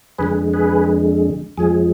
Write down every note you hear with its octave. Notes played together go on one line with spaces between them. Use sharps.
F2 D3 G#3 G#4 B4
G#4 B4
F2 F3 G#3 G#4